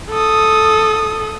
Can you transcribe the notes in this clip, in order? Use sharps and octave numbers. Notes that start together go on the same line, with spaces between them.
A4 D#6